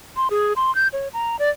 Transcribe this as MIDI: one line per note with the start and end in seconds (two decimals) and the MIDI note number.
0.17 0.28 84
0.30 0.53 68
0.56 0.74 84
0.75 0.88 91
0.93 1.08 73
1.13 1.39 82
1.39 1.49 74